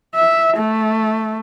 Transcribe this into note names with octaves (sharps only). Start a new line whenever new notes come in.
E5
A3